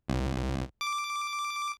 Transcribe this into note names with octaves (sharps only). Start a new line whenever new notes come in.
C2
D6